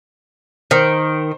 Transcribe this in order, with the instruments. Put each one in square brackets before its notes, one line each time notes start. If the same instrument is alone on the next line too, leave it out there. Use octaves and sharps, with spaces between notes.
[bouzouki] D#3 [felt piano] C5